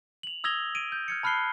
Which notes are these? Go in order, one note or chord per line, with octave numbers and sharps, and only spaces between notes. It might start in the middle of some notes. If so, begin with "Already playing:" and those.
F7 F#7
D#6 E6 G#6 A#6 F7 G7
D7 D#7
G6
F6 G#6 C#7
A5 B5 F6 F#6 C7 G7